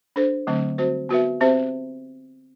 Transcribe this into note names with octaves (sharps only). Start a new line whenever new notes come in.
D4 A4 C5
D3 F#3 A3 C4
G3 C4 F#4 C5
B3 F#4 B4 E5
C4 G4 C5 E5